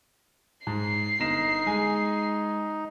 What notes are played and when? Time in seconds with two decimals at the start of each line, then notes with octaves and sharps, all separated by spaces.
0.67 G#2 C7
1.20 G1 D#4 A#6 E7
1.66 G#3 G#5